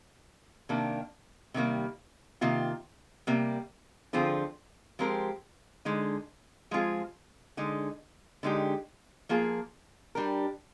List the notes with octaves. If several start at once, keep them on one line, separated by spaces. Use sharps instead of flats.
C3 D#3 A#3 D4
C3 D#3 G3 A#3
C3 D#3 A#3 F4
C3 G3 A#3
D3 F3 C4 F4 G#4
F3 G#3 C4 G4 A#4
D3 G#3 D#4
F3 G#3 C4 F4 G#4
D3 G#3 D#4
D3 G#3 D#4 G4
F3 A#3 F4 G#4
G3 D4 G4 A#4